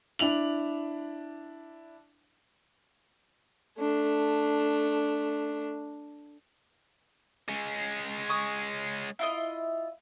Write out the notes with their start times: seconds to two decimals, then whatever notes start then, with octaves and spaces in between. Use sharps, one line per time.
0.19 D4 E4 F7 F#7
3.79 A3 D4
7.49 G#3 C#4
8.29 C#6 D#6
9.19 E4 F4 D#5